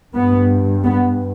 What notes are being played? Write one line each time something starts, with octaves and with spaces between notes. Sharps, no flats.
G2 B3
B3